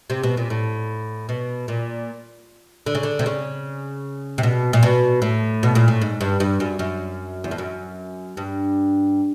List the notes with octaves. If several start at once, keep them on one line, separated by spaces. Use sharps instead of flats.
C3
B2
A#2
A2
B2
A#2
D3
C#3
D3
C3
C#3
C3
B2
A#2
B2
A2
B2
A#2
A2
G#2
G2
G2
F#2
F#2
E2
F2
F#2
G2